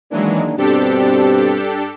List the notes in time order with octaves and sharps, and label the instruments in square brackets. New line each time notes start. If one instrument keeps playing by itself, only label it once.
[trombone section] D#3 A#3 D4 [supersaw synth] E3 F#3 G#3
[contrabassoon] G2 [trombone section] B2 C4 [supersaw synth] D4 G4 A4